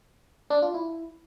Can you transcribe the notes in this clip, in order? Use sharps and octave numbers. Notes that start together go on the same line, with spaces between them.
D4
F4
E4